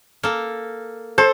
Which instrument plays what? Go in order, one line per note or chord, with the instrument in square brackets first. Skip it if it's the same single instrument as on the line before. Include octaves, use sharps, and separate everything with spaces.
[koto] A#3 A4
[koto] A4 [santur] C5